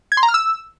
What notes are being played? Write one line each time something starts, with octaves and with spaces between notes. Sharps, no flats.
G#6
C6
A#5
F6
E6